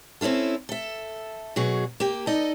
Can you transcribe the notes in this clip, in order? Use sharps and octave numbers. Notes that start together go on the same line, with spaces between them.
C4 C#4 E4 F4 A4
A4 E5
B2 F#3 F#4 G#4
A#3 G4
D#4 A4 D5 D#5